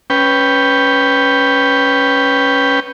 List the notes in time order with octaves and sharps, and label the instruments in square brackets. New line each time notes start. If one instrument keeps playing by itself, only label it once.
[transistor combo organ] C#4 B4 G5